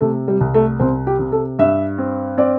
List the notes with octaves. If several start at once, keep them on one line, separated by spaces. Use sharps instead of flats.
C3 A3
G3
C2
A3
C2 C4
G4
C3
A4
G2 E5
C4
C4 D5